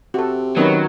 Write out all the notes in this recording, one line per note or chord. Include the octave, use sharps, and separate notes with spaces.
C3 F#4 A4
D#3 F#3 B3 C#4 B4